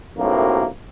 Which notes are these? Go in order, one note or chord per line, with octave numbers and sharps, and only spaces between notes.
B1 F#2 A2 C3 A#3